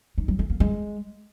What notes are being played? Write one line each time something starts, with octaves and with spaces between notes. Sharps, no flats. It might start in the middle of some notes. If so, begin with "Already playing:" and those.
D#4
F#3
A3
A#3
G#3